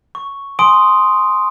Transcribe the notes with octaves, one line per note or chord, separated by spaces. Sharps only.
C#6
G#5 C6 D#6 D7